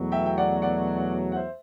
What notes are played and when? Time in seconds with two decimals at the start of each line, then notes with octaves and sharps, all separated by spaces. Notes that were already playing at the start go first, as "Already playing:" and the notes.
Already playing: E2 B2 F#3 A3
0.12 E5 G5
0.26 G5
0.37 D5 F#5
0.62 D5 F#5
1.32 F#5
1.36 C5 E5